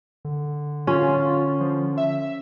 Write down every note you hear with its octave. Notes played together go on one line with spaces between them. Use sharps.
D3
C#4 F4
F3
E5